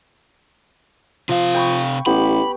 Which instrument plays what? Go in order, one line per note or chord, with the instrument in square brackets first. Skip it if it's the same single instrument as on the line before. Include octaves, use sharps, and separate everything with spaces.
[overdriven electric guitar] C3 F5 [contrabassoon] F3
[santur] G5 B5 C#6
[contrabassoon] A1 [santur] B3 G4 [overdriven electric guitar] B5